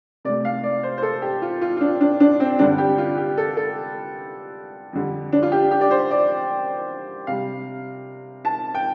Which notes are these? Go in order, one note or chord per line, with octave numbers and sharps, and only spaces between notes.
C3 A3 D5
F5
D5
C5
C5
A4
G4
F4
F4
F4
D4
D4
D4
C4
G2 D3 G3 D4
G4
F4
G4
A4
A4
F2 D3 G3
D4
F4
G4
G4
D5
C5
D5
C3 G3 F5
A5
G5